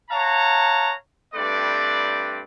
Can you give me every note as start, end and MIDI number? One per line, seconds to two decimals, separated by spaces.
0.10 0.92 73
0.10 0.92 77
0.10 0.92 78
0.10 0.92 81
0.10 0.92 82
1.35 2.40 43
1.35 2.40 57
1.35 2.40 60
1.35 2.40 71
1.35 2.40 74